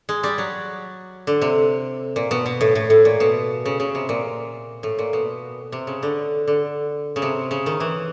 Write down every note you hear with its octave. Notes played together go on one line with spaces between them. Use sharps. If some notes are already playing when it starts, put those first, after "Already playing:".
G#3
G3
F#3
D3
C3
A#2
B2
B2
A2
A2
A2
A#2
B2
C#3
C#3
C3
A#2
A2
A#2
B2
C3
C#3
D3
D3
C#3
C3
C#3
D#3
E3